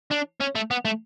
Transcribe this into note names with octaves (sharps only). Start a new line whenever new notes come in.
D4
C#4
A3
B3
A3